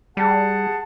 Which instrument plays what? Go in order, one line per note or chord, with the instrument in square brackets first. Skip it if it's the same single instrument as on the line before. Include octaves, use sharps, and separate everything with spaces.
[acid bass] G3 [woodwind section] G#4 F#5 A5